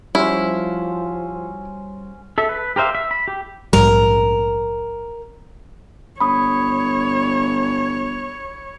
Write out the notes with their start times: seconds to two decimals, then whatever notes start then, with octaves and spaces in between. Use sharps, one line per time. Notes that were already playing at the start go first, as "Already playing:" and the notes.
0.15 F3 G3 C#4 E4 F#4 C5
2.38 A4 E5
2.49 B4
2.76 G4 A#4 C5 E5 F5
2.95 E5
3.11 B5
3.28 G4
3.73 A#1 G#2 G3 A#4
6.20 G1 C#5 B5 D#6